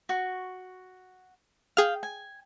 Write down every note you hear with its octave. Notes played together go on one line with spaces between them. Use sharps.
F#4 C#6
G#4 F5 G5 F6
G#5